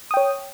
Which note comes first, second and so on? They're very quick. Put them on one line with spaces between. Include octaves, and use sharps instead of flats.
D#6 G5 C#5